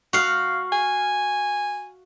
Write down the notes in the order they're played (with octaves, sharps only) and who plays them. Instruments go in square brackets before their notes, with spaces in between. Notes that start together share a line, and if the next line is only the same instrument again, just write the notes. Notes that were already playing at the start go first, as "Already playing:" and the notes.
[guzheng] F#4 F5
[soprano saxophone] G#5